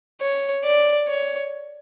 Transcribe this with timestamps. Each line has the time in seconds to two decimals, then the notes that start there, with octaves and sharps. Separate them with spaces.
0.21 C#5
0.65 D5
1.08 C#5